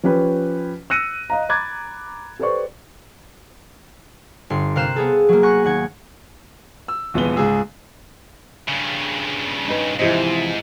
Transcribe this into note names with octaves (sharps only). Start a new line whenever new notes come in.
F3 C#4 G4 B4
E6 F#6 A#6 C#7 D#7
D#5 F5 A#5
A#5 B5 D6 F#6 G#6 A6
G4 A4 B4 C5 D5 C#6
G1 C6
C3 A#4 C5 F5 F#6 E7
B3 G#4 A4
F#3 A#3
F#5 G#5 C#6 F#6 A#6
D#2 F#5 G#6
E6
D#1 E3 G#3 B3 G7
C#2 G#2 G#4 E6
G2 C#3
D#4 B4
G#2 C3 E3 F3 E4 G4 D#5